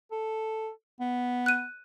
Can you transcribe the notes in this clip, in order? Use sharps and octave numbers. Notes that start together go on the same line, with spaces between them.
A4
B3
F#6 D#7